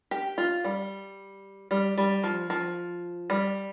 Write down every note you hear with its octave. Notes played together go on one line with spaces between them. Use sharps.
G4
F4
G3
G3
G3
F3
F3
G3